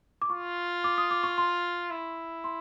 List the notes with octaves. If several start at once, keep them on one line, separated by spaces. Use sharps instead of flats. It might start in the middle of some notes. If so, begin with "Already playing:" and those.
D6
F4 C#6
D6
D#6
D6
C#6
C6
E4
C6